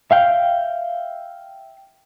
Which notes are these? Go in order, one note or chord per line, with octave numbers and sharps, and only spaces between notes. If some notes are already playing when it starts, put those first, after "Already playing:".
E5 F5 G5